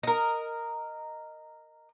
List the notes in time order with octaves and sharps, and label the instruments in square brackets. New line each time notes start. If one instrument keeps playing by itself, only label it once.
[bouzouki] A#4 D#5